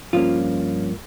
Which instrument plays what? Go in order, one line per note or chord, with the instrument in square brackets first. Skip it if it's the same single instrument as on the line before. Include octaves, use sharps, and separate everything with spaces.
[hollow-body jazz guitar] G2 F3 A#3 C#4 F4